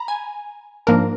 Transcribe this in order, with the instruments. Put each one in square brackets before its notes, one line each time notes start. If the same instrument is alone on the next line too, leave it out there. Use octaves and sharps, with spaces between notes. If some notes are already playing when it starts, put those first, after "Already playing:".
Already playing: [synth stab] A#5 B5
G#5
G#2 F3 A#3 D4 A#4